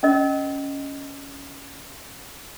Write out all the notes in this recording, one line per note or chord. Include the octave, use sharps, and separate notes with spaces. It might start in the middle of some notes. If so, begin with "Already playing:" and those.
C#4 A#4 D#5